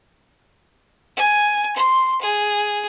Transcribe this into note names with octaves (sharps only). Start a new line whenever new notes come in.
G#5
C6
G#4